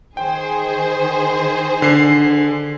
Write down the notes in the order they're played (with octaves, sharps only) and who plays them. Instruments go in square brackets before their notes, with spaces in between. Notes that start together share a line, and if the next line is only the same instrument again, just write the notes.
[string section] D#3 G#4 C5 [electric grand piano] G5
[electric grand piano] D3 C7